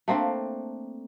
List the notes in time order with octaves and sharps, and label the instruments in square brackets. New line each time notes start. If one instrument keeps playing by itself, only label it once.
[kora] A3 A#3 C4 D4